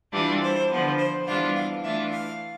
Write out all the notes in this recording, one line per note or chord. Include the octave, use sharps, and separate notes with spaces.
E3 G3 D4 F4
C5
D3 F3 B3
C5
E3 G3 B3 D4 F4 F5
F5
E3 A3 D4 F4 E5
F5